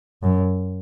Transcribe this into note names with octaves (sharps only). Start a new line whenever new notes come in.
F#2